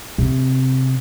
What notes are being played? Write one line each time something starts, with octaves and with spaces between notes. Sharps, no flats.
C3 C4